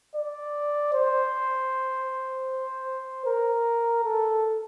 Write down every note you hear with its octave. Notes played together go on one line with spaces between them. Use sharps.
D5
C5
A#4
A4